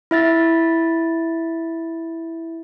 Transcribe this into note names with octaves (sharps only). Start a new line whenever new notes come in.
E4 E5 A6